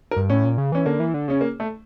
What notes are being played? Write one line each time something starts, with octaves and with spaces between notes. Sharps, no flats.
A#4
G2
A2 C#4
A#2
C#3
E3 C#4
D3 A#3
E3
D3
C#3 C#4
A#3
A3